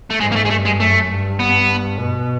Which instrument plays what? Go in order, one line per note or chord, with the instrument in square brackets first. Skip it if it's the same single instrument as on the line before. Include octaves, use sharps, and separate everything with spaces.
[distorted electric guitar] A3
[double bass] G#2 [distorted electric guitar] G#3
[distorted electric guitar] A#3
A3
G#3
[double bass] G2 [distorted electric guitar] A3
[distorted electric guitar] G#3
[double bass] F#2 [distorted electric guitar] A3
[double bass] G2
[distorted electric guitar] B3
[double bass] B2